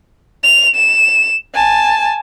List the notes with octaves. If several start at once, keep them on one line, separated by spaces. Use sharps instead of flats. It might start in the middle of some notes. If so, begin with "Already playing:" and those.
F7
E7
G#5 A5